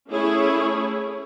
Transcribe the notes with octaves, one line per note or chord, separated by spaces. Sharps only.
A3 C#4 E4 G#4 C#5